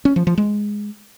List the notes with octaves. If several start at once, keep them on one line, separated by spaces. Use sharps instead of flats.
C#4
F3
F3
G#3